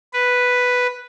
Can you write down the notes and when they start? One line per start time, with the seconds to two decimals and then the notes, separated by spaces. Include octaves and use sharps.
0.13 B4